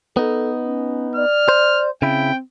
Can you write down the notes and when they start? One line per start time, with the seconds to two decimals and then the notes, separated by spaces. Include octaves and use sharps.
0.17 B3 D#4 A4
0.65 C#4
1.16 D5 F6
1.49 C5
2.02 C#3 C4 E4 G5